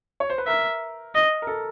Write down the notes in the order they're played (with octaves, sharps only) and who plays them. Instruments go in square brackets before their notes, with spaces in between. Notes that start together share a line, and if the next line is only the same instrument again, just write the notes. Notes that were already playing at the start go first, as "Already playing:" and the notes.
[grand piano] C#5
C5
B4
[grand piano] A#4 [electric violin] E5
[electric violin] D#5
[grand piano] A#4
A4